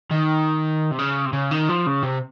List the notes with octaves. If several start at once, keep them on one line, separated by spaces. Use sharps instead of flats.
D#3
C3
C#3
C3
C#3
D#3
F3
C#3
C3